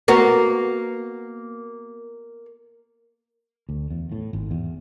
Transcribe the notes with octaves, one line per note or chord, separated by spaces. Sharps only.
A#3 B3 F#4
D2
E2
A2
G#1
E2